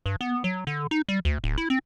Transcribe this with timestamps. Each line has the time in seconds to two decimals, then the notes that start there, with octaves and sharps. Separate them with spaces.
0.06 G2
0.21 B3
0.44 F#3
0.67 D3
0.91 D#4
1.09 G3
1.25 D2
1.44 D1
1.58 E4
1.70 C4